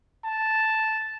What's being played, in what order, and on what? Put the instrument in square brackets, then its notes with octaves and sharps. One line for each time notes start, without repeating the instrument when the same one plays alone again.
[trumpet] A5